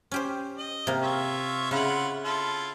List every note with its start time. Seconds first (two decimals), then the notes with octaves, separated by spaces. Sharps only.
0.11 C#4 G4 C5
0.58 D#5
0.87 C3 A#3
1.02 F4 C#5 E5
1.71 C#3 E4 F4 F#5
2.24 E4 F4 A4